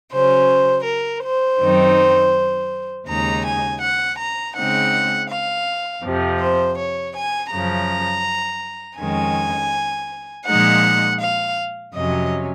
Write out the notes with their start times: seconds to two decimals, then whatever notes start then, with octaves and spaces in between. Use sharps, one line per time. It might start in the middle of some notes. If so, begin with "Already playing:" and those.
0.12 C#3 F#3 C#4 C5
0.86 A#4
1.23 C5
1.60 F#2 D#3 F#3 C4 D#4
3.07 D#2 C#3 G#3 D#4 A#5
3.45 G#5
3.82 F#5
4.19 A#5
4.55 C#3 G#3 C4 D#4 F#5
5.30 F5
6.03 F2 C3 F3
6.41 C5
6.77 C#5
7.15 G#5
7.52 F#2 C#3 F3 A#5
8.99 F2 D#3 G#3 C#4 G#5
10.47 A#2 F3 G#3 D#4 F#5
11.21 F5
11.95 F2 C3 F#3 C#4 D#5